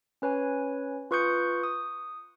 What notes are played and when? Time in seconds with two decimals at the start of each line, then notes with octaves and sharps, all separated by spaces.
0.22 C#4 B4 C#5 G#5
1.11 F4 B4 C#6 D#6 G6 C#7
1.63 D#6